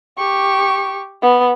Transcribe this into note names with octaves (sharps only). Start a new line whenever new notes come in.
G4 C#6
B3